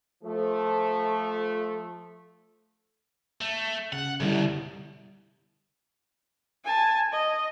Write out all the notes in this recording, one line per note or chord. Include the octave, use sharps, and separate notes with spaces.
F3 A3
A3
C#3 F#5
F#2 B2 D3 G3 E4
G#5 A5
D#5